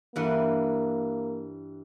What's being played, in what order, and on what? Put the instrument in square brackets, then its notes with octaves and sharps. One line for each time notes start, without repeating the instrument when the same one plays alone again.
[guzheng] G2 E3 F#5 [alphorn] A#3